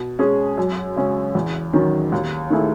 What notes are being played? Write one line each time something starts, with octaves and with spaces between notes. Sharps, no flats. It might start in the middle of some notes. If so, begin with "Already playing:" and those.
Already playing: B2
G#3 C#4 G#4
F#2
C#3 G#3 C#4
E2
D#3 F#3 C#4
D#2
D#3 A3 E4 G#4